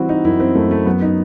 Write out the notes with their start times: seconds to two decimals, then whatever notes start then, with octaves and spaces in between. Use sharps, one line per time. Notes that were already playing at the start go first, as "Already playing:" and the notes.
Already playing: E3 G3 C4 E4 F#4
0.09 D#4
0.24 F#2 E4
0.40 C4
0.55 F#2 A3
0.71 A3
0.86 F#3 B3
1.02 D#4